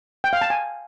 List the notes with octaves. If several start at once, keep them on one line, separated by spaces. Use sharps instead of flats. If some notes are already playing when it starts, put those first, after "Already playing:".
G5
F5
A5
G#5